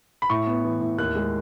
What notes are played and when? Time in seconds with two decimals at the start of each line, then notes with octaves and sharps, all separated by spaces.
0.22 B5
0.30 A2 C#6
0.47 B3
0.64 E3
0.81 A2
0.98 D#2 F#6
1.15 G#3